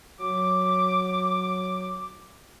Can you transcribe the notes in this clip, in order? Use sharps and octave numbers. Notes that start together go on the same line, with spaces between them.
F#3 D6